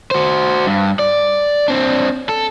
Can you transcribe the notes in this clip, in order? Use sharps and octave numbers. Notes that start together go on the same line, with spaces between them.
F#4 C5
G2
D5
C4 D4
A4